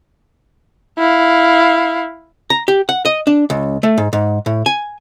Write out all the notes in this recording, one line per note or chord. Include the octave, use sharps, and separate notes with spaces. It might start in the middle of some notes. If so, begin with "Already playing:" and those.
E4 F5
A#5
G4
F#5
D#5
D4
C#2
A3
G#2
G#2
A2
G#5